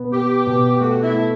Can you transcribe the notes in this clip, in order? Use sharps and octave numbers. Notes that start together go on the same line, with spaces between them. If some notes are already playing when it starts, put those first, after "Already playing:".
Already playing: B2 B3
B3 G4
B2
A3 F#4
E4
A3